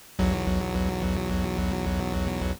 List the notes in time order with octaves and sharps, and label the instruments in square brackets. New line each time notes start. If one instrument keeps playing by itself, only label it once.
[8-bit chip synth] B1 E2 F#3